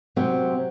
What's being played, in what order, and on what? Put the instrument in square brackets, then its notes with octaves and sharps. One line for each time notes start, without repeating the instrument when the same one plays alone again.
[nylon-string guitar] C3 F#3 C4 G4 C5